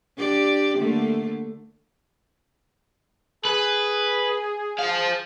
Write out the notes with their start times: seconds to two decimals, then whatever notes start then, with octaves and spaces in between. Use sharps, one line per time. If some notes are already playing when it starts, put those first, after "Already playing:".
0.17 D4 G4 D5
0.78 D3 A3 A#3
3.45 G#4 B4
4.78 C5 F5